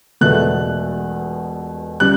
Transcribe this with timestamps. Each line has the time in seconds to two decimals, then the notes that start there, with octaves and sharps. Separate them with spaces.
0.21 E1 E2 B2 A3 F#6
2.00 C#3 G3 F#6